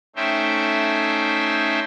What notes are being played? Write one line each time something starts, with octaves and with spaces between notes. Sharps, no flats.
A3 C#4 D#4 C5 E5 G5